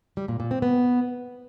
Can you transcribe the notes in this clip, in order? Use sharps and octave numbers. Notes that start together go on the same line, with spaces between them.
G3
A#2
A#2
C4
B3